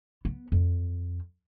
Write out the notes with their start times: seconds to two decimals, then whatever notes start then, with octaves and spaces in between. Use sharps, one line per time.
0.25 B3
0.52 F2